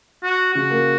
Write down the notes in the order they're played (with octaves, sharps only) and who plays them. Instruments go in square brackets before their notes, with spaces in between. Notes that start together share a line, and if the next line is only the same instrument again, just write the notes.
[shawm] F#4
[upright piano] C#3 [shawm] F#4
[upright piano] A#3